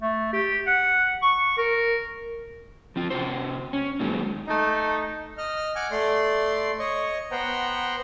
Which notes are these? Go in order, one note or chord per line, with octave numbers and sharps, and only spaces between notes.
A3
G4
F#5
C#6
A#4
F3 C4 F4
C3 F#4 C5
C#4
A#2 D#3 F#3 G#3
A3 D#4
D#5 F6
F#5 G#5 D6 F6
A3 D5 C6
C#5 D#5 C#6
B3 C5 F#5 G5 A#5